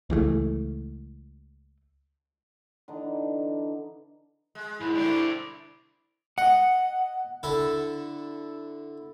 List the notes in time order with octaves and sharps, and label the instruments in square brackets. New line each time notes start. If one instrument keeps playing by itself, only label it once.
[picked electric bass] C#2 E3 G3 A3
[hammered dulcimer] D3 E3 D4 D#4
[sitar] G#3
[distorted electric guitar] D#2 G#2 [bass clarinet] E4
[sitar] D3 G3 A3 [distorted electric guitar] C5 D5
[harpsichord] D#5 [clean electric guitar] F#5
[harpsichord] D3 E4 A4